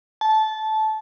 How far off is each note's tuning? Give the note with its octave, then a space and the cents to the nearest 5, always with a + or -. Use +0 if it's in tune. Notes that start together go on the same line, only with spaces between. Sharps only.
A5 -15